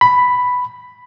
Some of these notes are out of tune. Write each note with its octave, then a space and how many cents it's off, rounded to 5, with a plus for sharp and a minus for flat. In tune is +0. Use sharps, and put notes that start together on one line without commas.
B5 +5